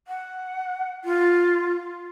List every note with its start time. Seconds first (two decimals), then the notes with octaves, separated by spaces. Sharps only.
0.07 F#5
1.04 F4